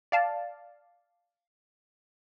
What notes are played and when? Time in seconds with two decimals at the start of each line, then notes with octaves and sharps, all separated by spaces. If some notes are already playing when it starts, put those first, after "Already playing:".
0.12 D5 F5 A5